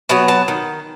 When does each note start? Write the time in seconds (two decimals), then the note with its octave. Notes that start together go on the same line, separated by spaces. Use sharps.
0.09 F#3 B3 A5
0.28 A5
0.48 D#3